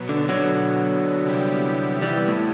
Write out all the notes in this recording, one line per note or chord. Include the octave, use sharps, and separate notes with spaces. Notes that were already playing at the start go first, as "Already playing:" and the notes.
Already playing: B2 F#3 B3
D3
D3 F#3
C3 G3 B3 E4 G4
E3 G3
A2